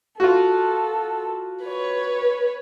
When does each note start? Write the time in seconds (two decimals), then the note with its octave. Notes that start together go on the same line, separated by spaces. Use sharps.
0.20 F4 F#4 A4
1.63 B4 C#5